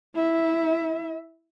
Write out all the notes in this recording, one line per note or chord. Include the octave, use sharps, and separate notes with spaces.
E4 E5